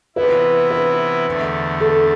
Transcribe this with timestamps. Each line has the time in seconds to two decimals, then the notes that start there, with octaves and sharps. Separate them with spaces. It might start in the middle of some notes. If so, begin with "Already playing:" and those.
0.16 C3 E3 B3 E4 B4
0.70 B4
1.26 E2 D3 A3
1.80 A4